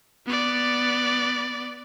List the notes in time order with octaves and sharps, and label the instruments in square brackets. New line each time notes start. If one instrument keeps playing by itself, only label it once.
[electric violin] B3 D5